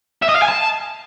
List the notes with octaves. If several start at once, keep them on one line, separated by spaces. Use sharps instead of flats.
E5
D#5
F5
G#5
A5